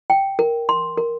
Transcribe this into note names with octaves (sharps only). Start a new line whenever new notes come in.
G5
A#4
C6
A#4